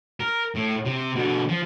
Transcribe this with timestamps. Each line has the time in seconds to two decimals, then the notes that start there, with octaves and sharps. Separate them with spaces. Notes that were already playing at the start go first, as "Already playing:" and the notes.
0.20 A#4
0.55 A2
0.85 C3
1.16 B2 D3
1.49 F3